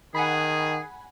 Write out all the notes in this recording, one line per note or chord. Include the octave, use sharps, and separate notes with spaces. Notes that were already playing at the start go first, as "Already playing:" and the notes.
D#3 G#4 F#5 G#5 B5